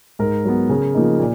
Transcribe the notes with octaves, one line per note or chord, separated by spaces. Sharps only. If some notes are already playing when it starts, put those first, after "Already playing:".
G#2 A#4
F#3 B3
C#3
F3 A#3 D#4
A#2